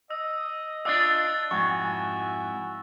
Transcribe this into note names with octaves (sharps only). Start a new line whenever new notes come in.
D#5 E6
D4 F4 D5 E6 F#6 A6
F2 G#2 E4 F#4 G#5 C#6